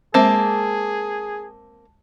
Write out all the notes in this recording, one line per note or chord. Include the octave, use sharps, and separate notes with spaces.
G#3 A#3 C4 G#4 E5 A5